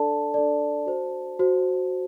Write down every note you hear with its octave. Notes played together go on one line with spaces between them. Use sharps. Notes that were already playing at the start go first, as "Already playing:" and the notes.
Already playing: D4 A4 D5 A5
D4 A4 D5
F#4 C5
F#4 C5